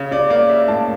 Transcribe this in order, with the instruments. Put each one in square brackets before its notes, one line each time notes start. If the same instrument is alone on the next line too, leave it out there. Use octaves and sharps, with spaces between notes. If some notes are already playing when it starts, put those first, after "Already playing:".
Already playing: [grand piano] C#3
C#3 D5
A#3 D5
C#3 E5
A2 A5